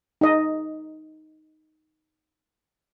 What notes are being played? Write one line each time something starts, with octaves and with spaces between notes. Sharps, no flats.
D#4 D#5